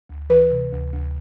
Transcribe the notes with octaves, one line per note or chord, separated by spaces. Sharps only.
D2
E3 B4
C3
D2
D2